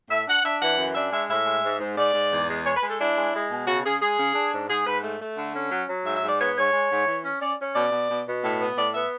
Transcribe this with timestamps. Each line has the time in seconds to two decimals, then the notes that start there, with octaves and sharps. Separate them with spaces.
0.10 A2 E5
0.28 D4 F#5
0.44 D4 E5
0.61 E3 F#5
0.78 F#2
0.95 D4 E5
1.12 G#3 E5
1.30 A2 E5
1.46 G#3
1.64 G#2
1.80 G#2
1.98 G#2 D5
2.14 G#2
2.31 E2
2.49 G#3
2.65 G#3 C#5
2.76 B4
2.83 G#3
2.88 A4
2.99 D4 E4
3.16 G#3
3.34 G#3
3.51 B2
3.67 C#3 F#4
3.84 C#3 G#4
4.01 G#3 G#4
4.19 C#3
4.35 D4
4.52 G#2
4.69 G#2 G#4
4.86 G#2 B4
5.03 A3
5.21 A3
5.38 D3
5.55 C#4
5.72 F#3
5.88 F#3
6.06 G#2 E5
6.16 E5
6.23 G#2
6.29 D5
6.39 B3 C#5
6.56 G#2 C#5
6.73 G#3
6.90 G#2
7.07 E3
7.24 C#4
7.41 C#4 D5
7.59 C#4
7.75 B2 D5
7.92 B2
8.10 B2
8.27 B2
8.44 A2
8.61 B3
8.77 A2 D5
8.94 B3 E5